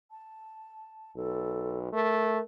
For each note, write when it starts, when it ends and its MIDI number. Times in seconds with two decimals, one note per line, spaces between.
0.11 1.14 81
1.16 1.91 35
1.16 1.79 69
1.93 2.39 57
1.93 2.41 70